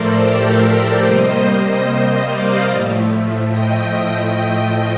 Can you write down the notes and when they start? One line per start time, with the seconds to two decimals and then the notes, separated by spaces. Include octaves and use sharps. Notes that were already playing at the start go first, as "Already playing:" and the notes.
Already playing: A2 F3 A3 A4 A#4 C5 D5
0.21 G4 A#4
0.61 G4 A#4
1.02 C3 G3 A#3 C5 D#5
2.26 D5 F5
2.67 A2 F3 A3
3.49 D#5 G5